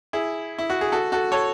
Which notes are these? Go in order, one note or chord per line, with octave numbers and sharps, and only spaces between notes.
E4 G#4
E4
F#4
G#4
F#4 A4
F#4 A4
A4 C#5